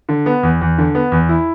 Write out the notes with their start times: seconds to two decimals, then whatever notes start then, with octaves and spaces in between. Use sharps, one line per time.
0.09 D3
0.26 B3
0.43 E2
0.61 E2
0.78 D3
0.95 B3
1.12 E2
1.29 E4